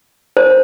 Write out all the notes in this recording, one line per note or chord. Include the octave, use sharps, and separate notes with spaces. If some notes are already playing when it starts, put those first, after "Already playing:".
C5